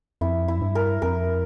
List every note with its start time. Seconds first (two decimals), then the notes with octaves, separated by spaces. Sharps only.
0.21 F2 E4
0.48 E4
0.57 F#2
0.62 G2
0.75 A#4
1.02 F2 A#4